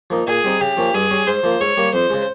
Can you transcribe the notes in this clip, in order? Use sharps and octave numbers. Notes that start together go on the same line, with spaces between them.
F3 A#3 D#4
A#2 G#4
G3 C4 D#4
C#3 G4
F3 A#3 C#4
G2 G#4
G3 C#4
G#2 C5
F3 A#3
G#2 C#5
G3 A#3
F2 C5
C#3 G#3